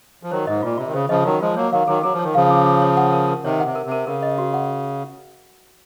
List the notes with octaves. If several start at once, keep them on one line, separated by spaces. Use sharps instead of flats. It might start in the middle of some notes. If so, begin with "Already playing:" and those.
F3
D#3 F#3 C5
G#2 D#5
A#2 F4
C3 F4
D#3
C#3 C5
C#3 F3 D#5
D#3 F#3 F4
F3 G#3 F4
F#3 A#3 C#5
D#3 F#3 F5
D#3 F#3 G#4
F#3 G#4
F3
C#5
D#3
C#3 F3 F5
G#4
G#4
C#5
F#5
A#4
A#4
C3 D#3 C#5
F#5
C3
A#4
C3
A#4
C#3 A#4
D#5
F#4
F#5